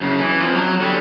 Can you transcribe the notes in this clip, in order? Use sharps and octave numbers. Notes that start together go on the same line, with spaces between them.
F#2 C#3
E3
F2 F3
F#3
D3 G3